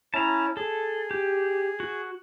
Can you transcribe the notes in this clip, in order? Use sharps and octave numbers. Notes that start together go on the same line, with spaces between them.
C#4 E4 A5 A#5
G#4 A4
G4
F#4